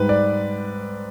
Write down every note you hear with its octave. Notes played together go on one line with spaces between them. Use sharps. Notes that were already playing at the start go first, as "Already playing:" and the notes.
Already playing: G#2 G3 B4
D5